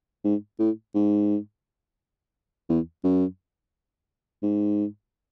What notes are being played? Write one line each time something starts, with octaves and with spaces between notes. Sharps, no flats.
G#2
A2
G#2
E2
F#2
G#2